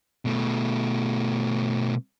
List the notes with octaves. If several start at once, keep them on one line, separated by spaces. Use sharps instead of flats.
B2 A3